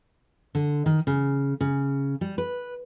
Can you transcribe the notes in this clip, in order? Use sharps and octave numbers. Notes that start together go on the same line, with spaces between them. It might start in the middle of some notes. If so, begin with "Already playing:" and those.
D3
D#3
C#3
C#3
G3
B4